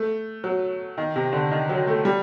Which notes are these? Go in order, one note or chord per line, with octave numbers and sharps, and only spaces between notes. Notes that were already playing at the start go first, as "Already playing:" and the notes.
Already playing: A3
F#3
D#3
C3
D3
D#3
F#3
A3
G3